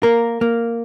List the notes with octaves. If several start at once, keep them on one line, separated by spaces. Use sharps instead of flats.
A#3 A#4
A#3